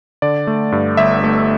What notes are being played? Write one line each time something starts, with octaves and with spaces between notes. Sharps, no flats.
D3 D5
A3
G2
G1 E5
A3